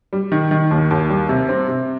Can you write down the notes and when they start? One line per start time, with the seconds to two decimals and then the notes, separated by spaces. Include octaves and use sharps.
0.13 G3
0.32 D#3
0.51 D#3
0.71 D#2
0.91 D#2
1.10 G3
1.29 C3
1.49 C4
1.68 C3